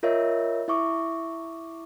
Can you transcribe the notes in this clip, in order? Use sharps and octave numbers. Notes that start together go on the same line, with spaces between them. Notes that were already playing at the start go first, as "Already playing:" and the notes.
F4 A#4 C#5 D#5 E5
E4 E5 C#6 D6